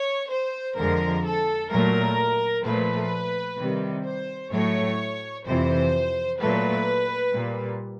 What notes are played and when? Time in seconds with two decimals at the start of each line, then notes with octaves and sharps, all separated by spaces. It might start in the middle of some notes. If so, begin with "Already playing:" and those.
Already playing: C#5
0.30 C5
0.77 F2 D3 F3 G#3 A#4
1.24 A4
1.70 A#2 F#3 A3 A#4
2.64 A#2 F3 A3 B4
3.57 C3 D#3 G3
4.05 C5
4.51 A2 F#3 A3 C#5
5.45 F2 C3 E3 C5
6.39 A#2 F#3 A3 B4
7.33 A#2 G3